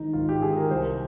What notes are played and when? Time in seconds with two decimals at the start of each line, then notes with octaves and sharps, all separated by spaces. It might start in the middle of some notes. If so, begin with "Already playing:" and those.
Already playing: G#1 G#2 D#3 D#4
0.13 G#1 F4
0.29 G4
0.42 G#2 D#3 G#4
0.57 A#4
0.71 C2 C5